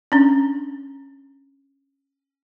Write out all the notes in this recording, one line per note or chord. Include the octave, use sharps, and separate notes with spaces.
C#4 D4